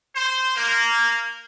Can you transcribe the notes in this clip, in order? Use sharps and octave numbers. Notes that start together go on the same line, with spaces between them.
C5
A#3